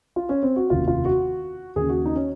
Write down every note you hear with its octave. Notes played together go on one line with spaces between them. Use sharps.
F4
C#4
C4
F#4
F1 D#2 C#3 F4
F4
F#4
D#2 C#3 G#4
F#4
D#4
C#4